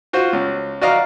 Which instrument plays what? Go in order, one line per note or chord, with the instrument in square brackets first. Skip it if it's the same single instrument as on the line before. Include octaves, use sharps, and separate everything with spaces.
[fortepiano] F4 F#4 C5
C#2
F#4 D5 D#5 F5 A#5